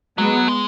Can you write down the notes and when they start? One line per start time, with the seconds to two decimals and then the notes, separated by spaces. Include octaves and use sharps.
0.18 F#3 G#3 B3
0.48 G#3